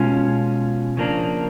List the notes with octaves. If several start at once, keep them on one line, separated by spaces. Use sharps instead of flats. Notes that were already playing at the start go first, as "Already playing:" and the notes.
Already playing: B2 G#3 C#4 F4
C#3 F3 A#3 D4